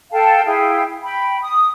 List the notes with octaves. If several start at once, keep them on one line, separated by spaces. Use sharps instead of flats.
A4 F5 G5 A5
E4 G#4 F5 G5
G5 B5
D#6